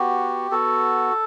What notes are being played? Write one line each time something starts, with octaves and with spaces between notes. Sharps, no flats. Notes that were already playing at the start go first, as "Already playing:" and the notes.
Already playing: B3 F#4 G4
B3 F#4 A4